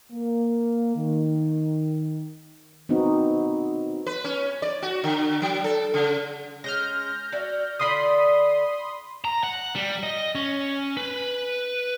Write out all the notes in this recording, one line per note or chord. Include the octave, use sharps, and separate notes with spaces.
A#3
D#3
B3 C4 D#4 F#4
B4
C#4
D5
F#4
D3
F#3
A4
C#3
G#3 C#4 F6 G6 A#6
F#4 D5 E5
D3 F4 D5 B5 C6 D#6
A#5
F#5
G3
D#5
C#4
B4